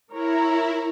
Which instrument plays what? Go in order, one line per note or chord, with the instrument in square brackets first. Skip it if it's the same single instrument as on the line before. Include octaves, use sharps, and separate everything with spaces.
[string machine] E4 [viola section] A#4 C#5 A#5